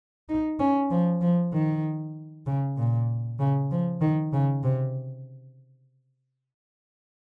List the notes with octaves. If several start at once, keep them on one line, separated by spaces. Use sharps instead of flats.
D#4
C#4
F3
F3
D#3
C#3
A#2
C#3
F3
D#3
C#3
C3